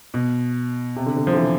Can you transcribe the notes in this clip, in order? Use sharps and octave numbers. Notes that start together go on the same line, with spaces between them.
B2
C3
D3
D3
F3
D3
E3